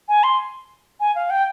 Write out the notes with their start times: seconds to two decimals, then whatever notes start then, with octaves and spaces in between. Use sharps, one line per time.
0.09 G#5
0.23 C6
1.00 G#5
1.15 F5
1.30 G5